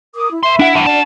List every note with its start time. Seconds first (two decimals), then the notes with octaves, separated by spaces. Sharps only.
0.15 A#4 D6 D#6
0.30 E4
0.43 B4 E5 C6
0.59 D4 E4 F#5
0.75 G2 E3
0.87 F#4 D5 A5